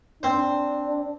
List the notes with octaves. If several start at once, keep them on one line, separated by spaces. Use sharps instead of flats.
C4 D4 C5